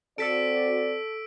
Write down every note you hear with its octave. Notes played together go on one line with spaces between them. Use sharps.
C4 F#4 A4 D5 E6 B6 D7